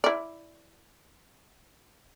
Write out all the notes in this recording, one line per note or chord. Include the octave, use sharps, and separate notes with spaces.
E4 D5